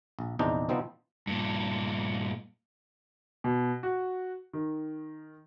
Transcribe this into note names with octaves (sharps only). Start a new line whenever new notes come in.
A#1
A#1 E2 C3 D4 D#4 C5
C3 F3 G3 B3 C4 D#4
G2 A#2
B2
F#4
D#3